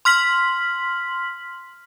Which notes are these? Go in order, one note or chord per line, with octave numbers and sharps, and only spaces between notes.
C6 F6 B6 F#7